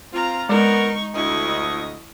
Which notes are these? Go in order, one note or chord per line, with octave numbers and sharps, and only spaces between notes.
C4 F4 A#5
G#3 B3 D#4 A#4 C#6
D2 E4 D#5 C#6